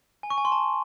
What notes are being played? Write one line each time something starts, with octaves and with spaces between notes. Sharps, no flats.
G#5
C#6
G#5
C6
A5